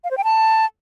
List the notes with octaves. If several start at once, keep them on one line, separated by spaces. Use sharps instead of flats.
F5
C5
G5
A5